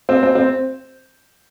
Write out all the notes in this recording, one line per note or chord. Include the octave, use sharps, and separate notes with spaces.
C4
C4
C4